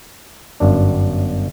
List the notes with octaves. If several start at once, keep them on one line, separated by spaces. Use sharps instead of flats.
G1 F#2 D4